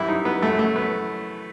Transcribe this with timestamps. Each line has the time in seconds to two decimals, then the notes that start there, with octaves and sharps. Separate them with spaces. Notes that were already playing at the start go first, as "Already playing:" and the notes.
Already playing: F#2 E3 G3 E4
0.08 D#4
0.25 B3
0.42 F#2 F#3 A3
0.59 A3
0.76 B3